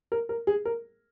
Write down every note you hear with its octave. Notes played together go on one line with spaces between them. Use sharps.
A#4
A#4
G#4
A#4